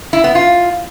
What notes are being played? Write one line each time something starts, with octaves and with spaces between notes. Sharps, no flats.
E4
B3
F4